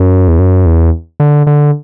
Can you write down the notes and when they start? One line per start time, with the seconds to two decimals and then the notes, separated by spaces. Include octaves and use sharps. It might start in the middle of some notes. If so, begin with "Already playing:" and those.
Already playing: F#2
0.28 E2
0.39 F#2
0.66 E2
1.20 D3
1.47 D3